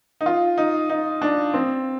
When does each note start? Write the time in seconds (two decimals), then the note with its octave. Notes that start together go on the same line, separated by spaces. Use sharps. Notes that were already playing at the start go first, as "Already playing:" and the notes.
0.21 D#4
0.26 F4
0.58 D#4
0.90 D#4
1.22 D4
1.54 C4